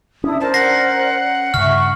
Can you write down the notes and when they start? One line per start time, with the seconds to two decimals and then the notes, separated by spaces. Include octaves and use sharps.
0.24 C#4 D4 E4 D#6
0.41 A#4 C5 D5 A5
0.54 F#5 A#6 C7
1.54 G2 C#3 E5 C#6 F6